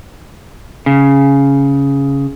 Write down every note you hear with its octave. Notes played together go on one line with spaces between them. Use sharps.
C#3